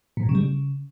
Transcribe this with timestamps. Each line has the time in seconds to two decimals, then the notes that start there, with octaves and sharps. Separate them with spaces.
0.17 A#2
0.23 G2
0.29 C#3
0.35 G3
0.41 C#3